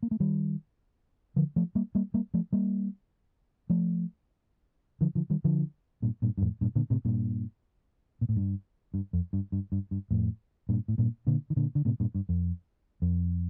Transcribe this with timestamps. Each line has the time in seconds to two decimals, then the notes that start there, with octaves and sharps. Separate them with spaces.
0.03 A#3
0.11 A3
0.20 D#3 G3
1.36 D3 F3
1.56 F3 A3
1.75 G3 A#3
1.95 G3 A#3
2.14 G3 A#3
2.34 F3 A3
2.53 G3 A#3
3.70 F3 A3
5.01 D3 F3
5.15 D3 F3
5.30 D#3 G3
5.44 D3 F3
6.02 G2 A#2
6.22 G2 A#2
6.37 G2
6.42 F2 A2
6.61 G2 A#2
6.75 A#2 D3
6.90 A2 C3
7.05 G2 A#2
8.21 A#2
8.29 A2
8.36 G2
8.94 G2
9.13 F2
9.33 G2
9.52 G2
9.72 G2
9.91 G2
10.11 F2 A2
10.69 G2 A#2
10.88 A2
10.98 G2 A#2
11.27 A#2 D3
11.50 D#3
11.56 A#2 D3
11.75 D3
11.85 A2 C3
12.00 G2 A#2
12.15 G2
12.29 F2
13.02 F2